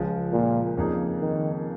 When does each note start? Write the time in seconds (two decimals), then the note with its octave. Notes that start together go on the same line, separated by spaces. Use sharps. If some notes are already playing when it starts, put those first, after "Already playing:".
Already playing: C#2 C#3 F3 G#3
0.32 A#2
0.77 F2 C#3 A#3 D#4 G#4
1.21 D#3